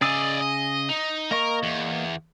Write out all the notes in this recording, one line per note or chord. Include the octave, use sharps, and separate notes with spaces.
C#3 G#4 D5 D#5 E6
D#5
D#4
A#3 A#4 D#5 C#6
E2